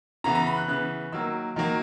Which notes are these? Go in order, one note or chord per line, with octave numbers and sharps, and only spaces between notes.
C#3 E3 B3 A#5
A#5
B5
F#6
C#3 E3 B3 F#6
D#3 F#3 A#3 E6
D#3 F#3 A#3